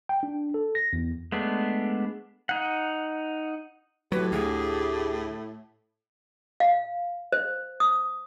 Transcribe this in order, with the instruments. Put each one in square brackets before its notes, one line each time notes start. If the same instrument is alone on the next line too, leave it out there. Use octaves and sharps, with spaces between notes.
[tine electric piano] G5
D4
A4
A#6
E2
[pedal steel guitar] G#3 A3 B3 D4
D#4 F#5
[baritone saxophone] A2 [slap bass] F#3 [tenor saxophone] G4 [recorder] B4
[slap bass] D2 [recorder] G#4
[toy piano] F5
C5
D#6